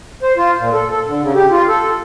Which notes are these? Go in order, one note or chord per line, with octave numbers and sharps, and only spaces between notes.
C5
F4
A#2
A4
A4
D3
C#3
G4
F4
A4